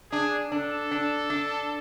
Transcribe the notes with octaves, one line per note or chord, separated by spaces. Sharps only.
D4 G#4
D4 A4
D4
D4